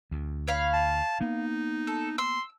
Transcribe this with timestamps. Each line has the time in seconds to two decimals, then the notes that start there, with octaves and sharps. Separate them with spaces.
0.11 D2
0.48 C#5 F5 B5
0.73 A5
1.21 A#3 B3 D#4
1.87 A4
2.18 C6 E6